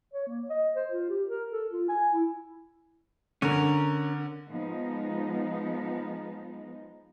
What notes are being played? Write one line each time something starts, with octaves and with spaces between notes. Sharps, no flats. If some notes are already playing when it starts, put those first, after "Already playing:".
C#5
A#3
D#5
C5
F4
G4
A#4
A4
F4
G#5
E4
D3 C#4 A#4
F3 G#3 B3 D#4